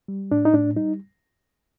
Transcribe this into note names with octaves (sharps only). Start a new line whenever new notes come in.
G3
A2 D4
D#4
A2 D4
G3 D#4